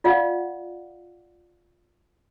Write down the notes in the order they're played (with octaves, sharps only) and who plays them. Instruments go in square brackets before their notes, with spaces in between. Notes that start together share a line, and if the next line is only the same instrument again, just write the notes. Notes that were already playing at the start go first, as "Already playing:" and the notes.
[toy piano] F4 D5 F5 F#5